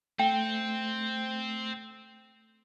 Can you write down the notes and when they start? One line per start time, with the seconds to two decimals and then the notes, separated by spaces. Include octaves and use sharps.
0.19 A3 C4 G5